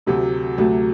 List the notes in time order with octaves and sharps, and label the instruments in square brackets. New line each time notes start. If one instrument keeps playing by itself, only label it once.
[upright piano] D2 C3 F#3 A3
D2 C3 F#3 A3